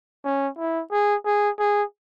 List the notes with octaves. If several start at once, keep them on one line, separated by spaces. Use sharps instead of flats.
C#4
E4
G#4
G#4
G#4